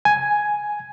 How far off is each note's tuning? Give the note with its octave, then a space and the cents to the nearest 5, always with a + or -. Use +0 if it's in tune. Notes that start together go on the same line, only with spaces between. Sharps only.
G#5 +5